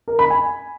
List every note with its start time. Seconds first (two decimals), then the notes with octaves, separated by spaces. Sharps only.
0.08 A#4
0.19 B5
0.30 G#5